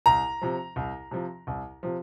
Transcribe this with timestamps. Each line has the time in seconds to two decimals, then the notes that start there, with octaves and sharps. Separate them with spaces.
0.06 C2 A#5
0.42 C3 F3
0.76 C2
1.11 C3 F3
1.47 C2
1.83 C3 F3